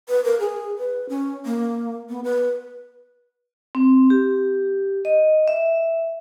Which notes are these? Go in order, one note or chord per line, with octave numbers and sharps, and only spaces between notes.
B4
A#4
G#4
B4
C#4
A#3
B3
B4
C4
G4
D#5
E5